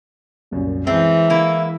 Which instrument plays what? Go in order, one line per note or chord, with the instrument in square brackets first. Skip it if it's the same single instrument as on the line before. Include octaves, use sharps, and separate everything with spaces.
[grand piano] C2 F#2 A#2
[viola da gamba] E3 [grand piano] G#3 [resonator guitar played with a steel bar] C4 [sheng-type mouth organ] E5
[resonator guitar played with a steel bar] A#3 E4